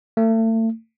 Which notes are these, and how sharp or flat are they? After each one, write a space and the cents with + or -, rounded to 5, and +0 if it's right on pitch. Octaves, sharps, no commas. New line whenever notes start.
A3 +35